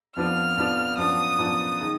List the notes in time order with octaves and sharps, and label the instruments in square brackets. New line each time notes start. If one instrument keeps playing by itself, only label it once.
[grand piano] F2 F3 B3 D4 F4 [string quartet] F6
[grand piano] F2 F3 B3 D4 F4
[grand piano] F#2 F3 B3 D4 F4 [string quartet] D#6
[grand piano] F#2 F3 B3 D4 F4
D#3 G#3 D#4